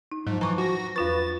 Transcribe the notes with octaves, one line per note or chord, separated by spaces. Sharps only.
D#4
G#2 F3 F#3
E3 A#5 C#6 D6
F#4 A#6
E2 F4 B4 C#6 A6